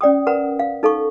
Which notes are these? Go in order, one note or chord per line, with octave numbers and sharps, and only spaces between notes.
C#4 D5 G5 D#6
A#4 B4 F#5 A#5
F5
D#4 A4 F5 C#6